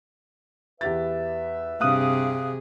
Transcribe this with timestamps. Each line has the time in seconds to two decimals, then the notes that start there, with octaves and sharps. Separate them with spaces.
0.81 E2 G4 B4 E5 A6
1.81 G2 C3 G#4 F5 D#6 F#6